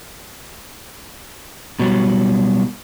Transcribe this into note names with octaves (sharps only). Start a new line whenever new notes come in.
B2 F#3 G3